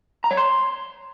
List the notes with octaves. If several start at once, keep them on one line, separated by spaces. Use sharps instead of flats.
A#5
C#5
C6